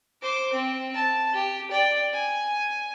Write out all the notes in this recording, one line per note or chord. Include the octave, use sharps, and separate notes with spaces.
C5 D6
C4
A5
G4
D5 G5
G#5